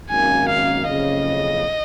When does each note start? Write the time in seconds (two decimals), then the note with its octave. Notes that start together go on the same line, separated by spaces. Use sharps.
0.10 G#1 F#2 D#3 A#3 C#4 G#5
0.49 F5
0.88 F#1 F2 C#3 D#5